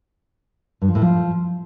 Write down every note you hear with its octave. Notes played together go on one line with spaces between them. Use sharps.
G2
F3
A2
F3